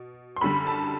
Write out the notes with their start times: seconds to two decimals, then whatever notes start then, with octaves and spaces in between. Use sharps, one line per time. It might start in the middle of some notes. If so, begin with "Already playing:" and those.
Already playing: B2
0.36 C6
0.41 F#2 D3 G3 B5
0.67 A5